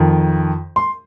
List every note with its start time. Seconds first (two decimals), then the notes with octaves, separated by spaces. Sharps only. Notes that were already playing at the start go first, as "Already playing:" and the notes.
Already playing: F2 D#3
0.76 C6